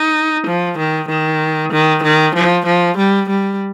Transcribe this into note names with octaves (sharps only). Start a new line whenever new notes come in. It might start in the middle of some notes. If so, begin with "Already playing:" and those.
Already playing: D#4
F3
D#3
D#3
D#3
D#3
F3
F3
G3
G3